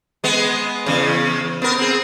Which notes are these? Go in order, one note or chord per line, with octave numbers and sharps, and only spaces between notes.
G#3 B3
E2 C#3
B3 A#4
C4 G#4